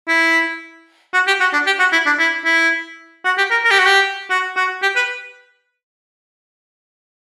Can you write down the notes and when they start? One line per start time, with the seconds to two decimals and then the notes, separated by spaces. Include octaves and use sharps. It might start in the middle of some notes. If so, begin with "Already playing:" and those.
0.08 E4
1.14 F#4
1.27 G4
1.40 F#4
1.53 D4
1.66 G4
1.79 F#4
1.92 E4
2.06 D4
2.19 E4
2.45 E4
3.25 F#4
3.38 G4
3.51 A#4
3.65 A#4
3.71 G4
3.79 F#4
3.86 G4
4.30 F#4
4.56 F#4
4.82 G4
4.96 B4